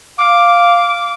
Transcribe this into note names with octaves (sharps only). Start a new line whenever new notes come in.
F5 D6